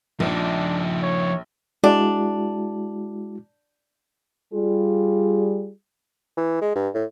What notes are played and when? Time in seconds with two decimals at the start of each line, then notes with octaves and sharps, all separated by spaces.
0.20 A#1 F3 D4 D#4
1.02 C#5
1.84 G#3 D4 E4 F#4
4.53 G3 F4 G#4
6.37 E3
6.61 G#3
6.75 G2
6.94 A2